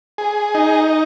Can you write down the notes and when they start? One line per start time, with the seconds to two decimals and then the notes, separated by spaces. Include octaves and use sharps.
0.18 G#4
0.55 D#4